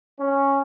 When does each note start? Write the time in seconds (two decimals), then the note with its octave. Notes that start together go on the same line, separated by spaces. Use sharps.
0.21 C#4